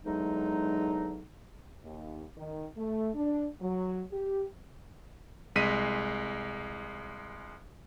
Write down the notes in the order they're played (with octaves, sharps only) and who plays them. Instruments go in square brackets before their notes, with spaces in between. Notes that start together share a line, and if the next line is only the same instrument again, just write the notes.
[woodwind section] E2 D3 F#3 G#3 D#4
[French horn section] D#2
D#3
A3
D4
F#3
G4
[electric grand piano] C2 G#3 B6 D#7